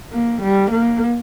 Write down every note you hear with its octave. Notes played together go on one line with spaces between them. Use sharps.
A#3
G3
A#3